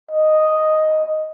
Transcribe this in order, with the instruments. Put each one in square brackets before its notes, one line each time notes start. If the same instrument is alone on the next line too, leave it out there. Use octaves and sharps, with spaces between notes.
[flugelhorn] D#5